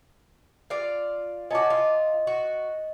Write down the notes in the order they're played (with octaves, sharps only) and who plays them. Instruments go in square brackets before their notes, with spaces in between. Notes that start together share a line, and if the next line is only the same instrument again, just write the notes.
[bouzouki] F4 D5 F5
[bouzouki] C#4 F#4 [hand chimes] D#5 A5 D6
[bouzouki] F4 [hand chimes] D#5
[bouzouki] F#4